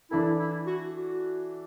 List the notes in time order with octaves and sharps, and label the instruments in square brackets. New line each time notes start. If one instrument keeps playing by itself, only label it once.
[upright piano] E3 D4 A4 [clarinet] E4
[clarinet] E4
F#4
F#4